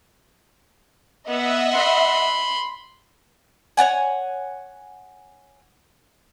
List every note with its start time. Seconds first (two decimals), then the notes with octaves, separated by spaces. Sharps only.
1.28 B3 D#5 E5 F#5
1.74 B5 C6
3.77 C#5 D5 F#5 G#5